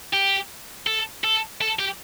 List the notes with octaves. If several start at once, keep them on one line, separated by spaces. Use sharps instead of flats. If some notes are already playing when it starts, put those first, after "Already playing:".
G4
A4
A4
A4
G4